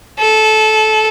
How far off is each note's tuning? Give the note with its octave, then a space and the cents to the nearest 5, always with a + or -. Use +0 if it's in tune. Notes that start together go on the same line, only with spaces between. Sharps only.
A4 -20